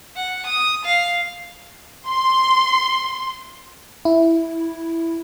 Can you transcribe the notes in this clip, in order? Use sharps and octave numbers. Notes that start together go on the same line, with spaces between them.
F#5
D#6
F5
C6
E4